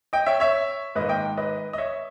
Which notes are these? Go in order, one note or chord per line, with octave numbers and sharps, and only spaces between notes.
D#5 G5
C#5 E5
C#5 E5
G#2 D#3 A#3 B4 D#5
D#5 G5
B4 D#5
D#5
C#5 E5